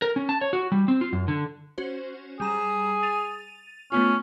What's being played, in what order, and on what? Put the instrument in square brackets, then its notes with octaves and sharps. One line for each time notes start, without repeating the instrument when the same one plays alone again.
[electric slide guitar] A#4
C#4
A5
C#5
F#4
G3
C4
F4
F#2
D3
[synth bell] C#4 F#4 C5
[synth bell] G3 A#5 E7 [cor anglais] G#4
[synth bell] A6 D#7 F7
[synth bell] A3 B3 F4 [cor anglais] C#4